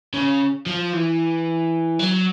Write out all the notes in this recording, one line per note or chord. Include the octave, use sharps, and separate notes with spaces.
C#3
F3
E3
F#3